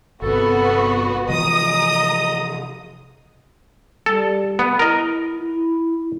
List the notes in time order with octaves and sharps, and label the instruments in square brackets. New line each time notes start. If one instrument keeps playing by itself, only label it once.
[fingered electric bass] G1 C3 [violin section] B3 F#4 [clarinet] A4
[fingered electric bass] C3 E3 F3 [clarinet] D#5 [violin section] A#5 D#6
[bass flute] G3 [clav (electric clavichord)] A4
[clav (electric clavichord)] B3
[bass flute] E4 [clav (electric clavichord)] A#4 D#5
[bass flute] E4